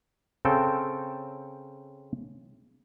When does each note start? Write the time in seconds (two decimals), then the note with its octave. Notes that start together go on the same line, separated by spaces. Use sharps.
0.45 C#3 C4 A4 G5